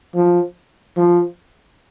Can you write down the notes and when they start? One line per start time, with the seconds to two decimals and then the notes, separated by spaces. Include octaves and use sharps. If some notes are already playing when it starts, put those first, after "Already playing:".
0.15 F3
0.97 F3